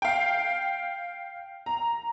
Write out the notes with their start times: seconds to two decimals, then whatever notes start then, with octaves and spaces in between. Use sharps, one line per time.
0.02 F5 G5
1.66 A#5